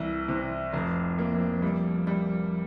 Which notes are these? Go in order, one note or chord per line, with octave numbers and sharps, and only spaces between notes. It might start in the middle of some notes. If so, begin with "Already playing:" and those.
Already playing: C2 E3
C3
F1 F3
A#3
G3
G3